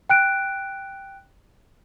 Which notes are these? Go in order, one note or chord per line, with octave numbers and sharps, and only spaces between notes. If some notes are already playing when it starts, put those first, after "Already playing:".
G5 F#6 D7